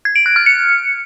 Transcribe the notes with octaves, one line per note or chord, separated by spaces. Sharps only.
G#6
D7
F#6
F6
C#7